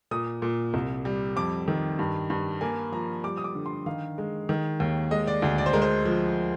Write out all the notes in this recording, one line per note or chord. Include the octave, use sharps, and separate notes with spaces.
A#2 D#6
A#2
C2
G3
F2 D6
D#3
G2
G2
A#3 G#5
F3 A#5
G3 D6
D#6
D6
D3
C6
D#3 F5
G#3
D#3
D#2
G#3 D#5
D5
D2
D5
C5
G#3 A#4
C5
F3